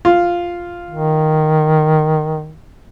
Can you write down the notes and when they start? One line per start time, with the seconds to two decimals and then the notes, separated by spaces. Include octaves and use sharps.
0.05 F4
0.90 D#3